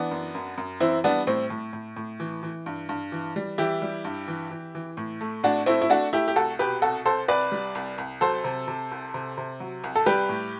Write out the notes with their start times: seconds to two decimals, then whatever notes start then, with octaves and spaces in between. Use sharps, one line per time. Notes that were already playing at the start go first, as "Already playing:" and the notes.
Already playing: E3 B3 D4
0.11 F#2
0.35 F#2
0.58 F#2
0.80 E3 C4 E4
1.04 G3 B3 D4
1.27 A2 C4
1.50 A2
1.73 A2
1.96 A2
2.20 E3
2.43 E3
2.66 G2
2.89 G2
3.12 E3
3.36 G3
3.58 E3 E4 G4
3.82 G3
4.05 G2
4.28 E3
4.51 E3
4.75 E3
4.97 A2
5.21 A3
5.43 A2 D4 F#4
5.66 A3 C4 E4
5.82 E4
5.90 A3 D4 F#4
6.13 A3 E4 G4
6.28 G4
6.36 C2 F#4 A4
6.59 B2 G4 B4
6.82 C2 F#4 A4
7.06 C2 A4 C5
7.28 C2 B4 D5
7.52 G3
7.75 C2
7.98 C2
8.21 F#3 A4 C5
8.44 C3
8.68 C3
8.91 C2
9.14 C3
9.38 C3
9.60 F#3
9.84 C2
9.96 A4
10.06 G3 G4 B4
10.29 A2